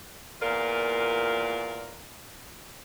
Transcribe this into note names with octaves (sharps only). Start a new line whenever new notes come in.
E2 A#2 F4 A#4 D5